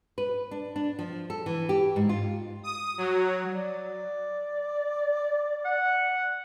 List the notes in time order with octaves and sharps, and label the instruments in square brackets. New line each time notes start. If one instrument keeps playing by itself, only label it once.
[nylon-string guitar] B4
D4
D4
F3
A4
E3
G4
G#2
F4
[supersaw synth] D#6
F#3
[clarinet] D5
[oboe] F#5